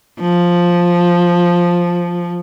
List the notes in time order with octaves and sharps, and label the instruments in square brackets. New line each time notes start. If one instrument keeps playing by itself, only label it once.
[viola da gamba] F3